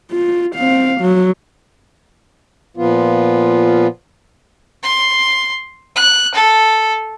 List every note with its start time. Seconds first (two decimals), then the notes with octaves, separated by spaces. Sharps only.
0.11 F4
0.55 C4 F5
1.01 F#3
2.77 A#2 F3 B3 F4
4.83 C6
5.96 F#6
6.34 A4